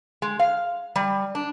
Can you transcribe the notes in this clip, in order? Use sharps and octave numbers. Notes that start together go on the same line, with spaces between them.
G#3
F5
G3
D4